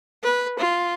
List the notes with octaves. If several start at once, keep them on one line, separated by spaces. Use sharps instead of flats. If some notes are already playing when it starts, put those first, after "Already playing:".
B4
F4